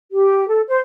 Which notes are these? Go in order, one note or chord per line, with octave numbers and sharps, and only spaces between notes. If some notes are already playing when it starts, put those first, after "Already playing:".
G4
A4
C5